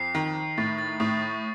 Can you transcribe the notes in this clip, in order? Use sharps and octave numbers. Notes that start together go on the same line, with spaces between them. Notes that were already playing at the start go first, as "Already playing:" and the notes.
Already playing: F2 C7
D#3
A2 A6
A6
A2 D#6
C#6